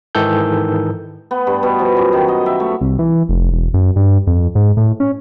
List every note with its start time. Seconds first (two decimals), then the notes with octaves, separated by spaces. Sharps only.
0.15 G#2 D#3 E3 A4 G6
1.31 B3
1.47 G2
1.63 B2
1.79 F3
1.97 F#2
2.13 D#3
2.28 D#5
2.46 E5
2.60 A3
2.81 C2
2.99 E3
3.29 F1
3.52 E1
3.74 F#2
3.96 G2
4.27 F2
4.55 G#2
4.77 A2
5.00 C#4